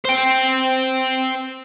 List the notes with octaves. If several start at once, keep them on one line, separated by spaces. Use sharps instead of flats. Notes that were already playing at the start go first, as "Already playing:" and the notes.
C5 G5